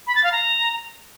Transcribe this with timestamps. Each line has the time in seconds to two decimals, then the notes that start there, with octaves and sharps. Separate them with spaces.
0.07 B5
0.15 A6
0.24 F5
0.32 A#5